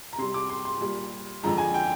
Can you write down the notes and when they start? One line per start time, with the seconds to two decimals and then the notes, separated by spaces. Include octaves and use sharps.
0.13 A#5
0.18 C3 G3 C6
0.34 D6
0.50 C6
0.65 C6
0.81 A#2 G3
1.43 F2 D3 F3 G#3 A#5
1.58 G#5
1.74 G5